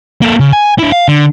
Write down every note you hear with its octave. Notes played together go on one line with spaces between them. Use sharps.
A#3 A4
C#3
G#5
D4 E4
F5
D3